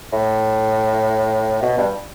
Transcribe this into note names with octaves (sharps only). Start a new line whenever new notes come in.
A2
B2
G2